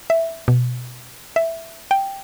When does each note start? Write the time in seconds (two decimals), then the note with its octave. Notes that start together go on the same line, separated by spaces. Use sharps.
0.10 E5
0.48 B2
1.36 E5
1.91 G5